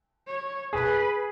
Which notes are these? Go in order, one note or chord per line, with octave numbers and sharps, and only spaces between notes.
C#5
G#4 B4